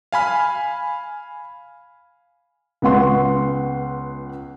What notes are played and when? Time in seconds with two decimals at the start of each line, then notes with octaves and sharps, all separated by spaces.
0.12 F5 G#5 B5 F6
2.82 C#2 B3 F#5 C6 C#6